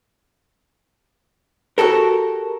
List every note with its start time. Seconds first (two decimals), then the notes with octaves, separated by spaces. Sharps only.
1.78 F#4 G4 A4 A#4